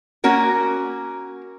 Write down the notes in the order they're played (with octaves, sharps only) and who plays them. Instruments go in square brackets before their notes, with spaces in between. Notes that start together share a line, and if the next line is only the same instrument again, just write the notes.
[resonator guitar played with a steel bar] A#3 C#4 F#4 A#4